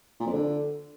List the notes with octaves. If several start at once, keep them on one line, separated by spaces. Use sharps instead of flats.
A#2
F2
D3